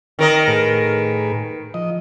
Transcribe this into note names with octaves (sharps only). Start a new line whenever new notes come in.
D#3 A#4 D#5
A2 G#4 B4
F3 D#5